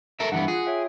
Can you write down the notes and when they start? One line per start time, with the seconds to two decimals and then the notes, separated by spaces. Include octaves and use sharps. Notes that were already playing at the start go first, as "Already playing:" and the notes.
0.20 A4 A#4 E5
0.32 G2 E3 B3 F#5
0.48 F4 G#4
0.66 C#5 E5 G5